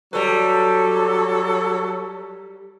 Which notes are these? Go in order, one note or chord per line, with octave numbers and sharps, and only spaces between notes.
F#3 G3 A4 B4